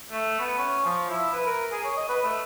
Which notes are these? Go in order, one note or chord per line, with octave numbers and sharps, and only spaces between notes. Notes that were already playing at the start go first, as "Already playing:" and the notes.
A3
B3
C#4
F3
E4
B4
A#4
G#4
C#5
D#5
B4
A3